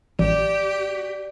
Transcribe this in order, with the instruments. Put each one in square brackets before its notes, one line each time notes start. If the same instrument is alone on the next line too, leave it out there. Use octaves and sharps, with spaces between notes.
[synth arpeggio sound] A1 [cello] G4 [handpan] D5